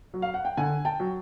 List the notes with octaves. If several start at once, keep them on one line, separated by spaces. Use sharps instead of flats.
F#3
F5
F#5
G5
D3 F#5 G#5
G5 A5
F#3